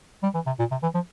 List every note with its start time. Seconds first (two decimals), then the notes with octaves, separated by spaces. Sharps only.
0.23 G3
0.34 E3
0.46 C3
0.59 A#2
0.71 C3
0.82 E3
0.94 F3